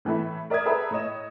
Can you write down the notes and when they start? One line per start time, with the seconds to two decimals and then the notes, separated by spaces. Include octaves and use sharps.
0.05 A2 E3 A3 E5 B5
0.50 A#4 D5 E5 D#6 G#6
0.65 G#4 A4 B4 E5 A#5 B5
0.91 A2 C#5 D#5 E7